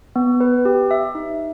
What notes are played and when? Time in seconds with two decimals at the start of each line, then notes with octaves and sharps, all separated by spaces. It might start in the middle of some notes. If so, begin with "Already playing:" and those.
0.16 B3
0.40 B4
0.65 G4
0.91 E5
1.15 D#4